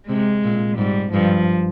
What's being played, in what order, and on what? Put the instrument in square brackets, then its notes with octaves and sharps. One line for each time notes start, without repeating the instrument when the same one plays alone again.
[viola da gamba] C3 [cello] G#3
[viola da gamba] A#2
[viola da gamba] G#2 [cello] G3
[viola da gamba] G2 [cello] F3